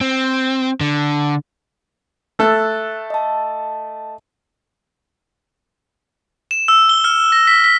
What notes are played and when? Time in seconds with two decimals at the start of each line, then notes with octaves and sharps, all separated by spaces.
0.01 C4
0.81 D3
2.39 A3 A4 E6 F#6 A6
3.10 D#5 A5
6.51 E7
6.68 E6
6.89 G7
7.04 F6
7.32 A#6
7.47 B6
7.64 B6